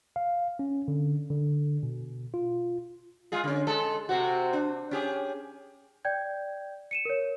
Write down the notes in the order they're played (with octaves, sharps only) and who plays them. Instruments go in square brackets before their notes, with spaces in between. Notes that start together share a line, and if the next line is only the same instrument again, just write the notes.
[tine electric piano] F5
C#4
D3
D3
B2
F4
[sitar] G#3 F4 G#4
D3 C#4
G#3 A4
C3 C4 F#4
D4
C#4 G4 G#4
[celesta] D5 G5 G6 G#6
C#7 D#7 E7
A#4 C#5